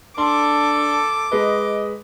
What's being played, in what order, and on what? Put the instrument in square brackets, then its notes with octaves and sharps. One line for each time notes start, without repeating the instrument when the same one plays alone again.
[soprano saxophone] D4 [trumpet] A4 [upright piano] C6 [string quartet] D6
[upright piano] G#3 B4 [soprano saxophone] D#5